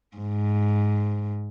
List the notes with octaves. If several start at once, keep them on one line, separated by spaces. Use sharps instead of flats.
G#2